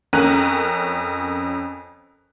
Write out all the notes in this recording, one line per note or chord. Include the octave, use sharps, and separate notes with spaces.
F2 C#4 A#4 F#6 D#7